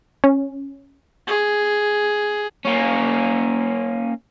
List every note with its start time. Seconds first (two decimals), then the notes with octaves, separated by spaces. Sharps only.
0.24 C#4
1.27 G#4
2.65 A#3 C#4